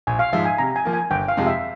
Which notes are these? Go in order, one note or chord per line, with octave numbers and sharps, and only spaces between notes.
A#1 G#5
F5
G#2 F3 G#3 E5
G#5
C3 A#5
G#5
F3 A#3
G#5
G1 G5
F5
F2 C3 F3 G#3
E5